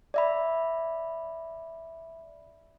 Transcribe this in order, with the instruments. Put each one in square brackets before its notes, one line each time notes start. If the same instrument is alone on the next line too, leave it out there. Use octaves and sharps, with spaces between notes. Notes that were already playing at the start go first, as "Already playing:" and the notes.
[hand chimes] D5 E5 B5